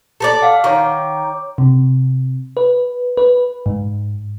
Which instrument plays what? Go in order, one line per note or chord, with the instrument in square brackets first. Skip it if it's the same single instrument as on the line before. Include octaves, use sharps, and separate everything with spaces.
[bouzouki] A4 A#4 D5
[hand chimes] F5 F#5
[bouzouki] D#3 [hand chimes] C#5 D6
[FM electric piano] C3
B4
B4
G#2